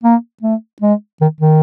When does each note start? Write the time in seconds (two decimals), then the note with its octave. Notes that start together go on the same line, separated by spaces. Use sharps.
0.04 A#3
0.43 A3
0.82 G#3
1.21 D#3
1.40 D#3